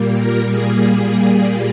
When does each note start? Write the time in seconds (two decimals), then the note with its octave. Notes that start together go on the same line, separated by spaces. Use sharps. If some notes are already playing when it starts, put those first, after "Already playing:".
Already playing: A#2 G3 A#3
0.17 A#4
0.51 G#4